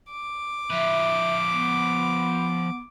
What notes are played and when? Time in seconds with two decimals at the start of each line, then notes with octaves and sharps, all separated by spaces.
0.10 D6
0.70 F3 B4 E5
1.53 B3